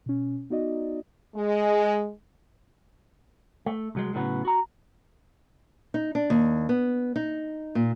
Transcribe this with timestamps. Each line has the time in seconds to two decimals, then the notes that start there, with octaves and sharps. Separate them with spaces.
0.06 B2 C#4
0.50 B3 D#4 F#4 D5 D#5
1.35 G#3
3.66 A3
3.95 C2 F#3 G#3
4.14 A2 C#3 F#3 A#3 B3 C#4
4.45 F#4 A#5
5.94 D#4
6.15 D4
6.30 D#2
6.69 B3
7.16 D#4
7.75 A#2